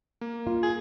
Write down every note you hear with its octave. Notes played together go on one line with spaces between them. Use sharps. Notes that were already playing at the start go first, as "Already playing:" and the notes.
A#3
F4
G#4